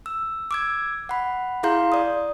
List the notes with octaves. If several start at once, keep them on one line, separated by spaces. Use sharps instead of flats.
E6
D6 E6 G#6
F#5 B5
E4 G#4 F5 A#5 C6 G6
D5 D#6